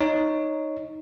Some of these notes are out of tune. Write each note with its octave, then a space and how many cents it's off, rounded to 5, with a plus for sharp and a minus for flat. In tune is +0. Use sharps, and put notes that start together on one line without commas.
D#4 +0 C#5 +0